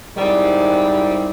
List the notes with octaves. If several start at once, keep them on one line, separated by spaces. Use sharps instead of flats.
G#2 D#3 G3 C4 E4